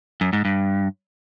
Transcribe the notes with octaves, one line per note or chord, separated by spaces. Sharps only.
F#2
G#2
G2